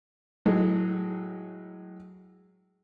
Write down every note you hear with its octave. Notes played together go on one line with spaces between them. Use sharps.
A2 F#3 G#3 A3